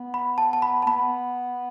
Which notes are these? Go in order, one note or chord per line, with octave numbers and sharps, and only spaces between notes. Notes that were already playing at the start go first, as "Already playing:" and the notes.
Already playing: B3
B5
A5
A5
B5
A5
B3 B5